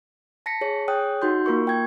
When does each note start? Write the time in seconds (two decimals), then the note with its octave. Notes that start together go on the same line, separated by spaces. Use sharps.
0.46 A5 A#6 B6 C#7
0.61 G#4 C#5
0.88 G#4 C#5 G5 D#6 F#6
1.22 D#4 F#4 C6 G6
1.46 A#3 F4 A#4 C#6
1.67 G5 G#6